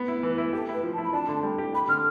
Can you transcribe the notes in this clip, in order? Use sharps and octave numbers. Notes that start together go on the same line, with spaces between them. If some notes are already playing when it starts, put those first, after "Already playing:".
Already playing: B3
E4
E3 B4
E4
G4 A4
E4 B4
F3
A5
E4
B5
D4 A5
D3
G3
G4
G4 B5
D3 F6